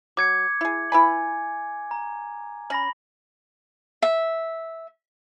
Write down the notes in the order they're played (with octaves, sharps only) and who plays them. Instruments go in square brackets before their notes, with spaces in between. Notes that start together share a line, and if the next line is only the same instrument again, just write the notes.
[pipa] F#3 [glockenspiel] D6 G#6 C#7
[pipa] E4 G#4
[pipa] E4 B4 B5 [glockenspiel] G#5
[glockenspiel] A#5
[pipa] C#4 [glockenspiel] B5 A#6 F#7
[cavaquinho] E5